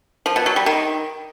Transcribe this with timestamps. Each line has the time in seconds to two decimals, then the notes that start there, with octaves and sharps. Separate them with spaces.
0.26 F3
0.36 B2
0.46 F#3
0.56 G3
0.66 D#3